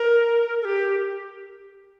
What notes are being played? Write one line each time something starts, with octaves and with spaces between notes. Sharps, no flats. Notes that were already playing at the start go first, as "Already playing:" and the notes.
Already playing: A#4
A4
G4